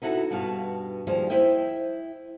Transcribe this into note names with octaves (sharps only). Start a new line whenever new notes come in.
B3 D#4 E4 F#4 A4
G2 B2 B3 F5 A5
D#2 F3 G3 G#4 C5 F5
E4 C5 D#5 E5 G5